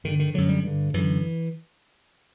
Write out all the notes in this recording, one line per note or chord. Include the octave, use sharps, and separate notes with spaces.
G2 D3 D#3
D#3
F#2 D3 F#3
G3
G2 D3
F#2 D3 E3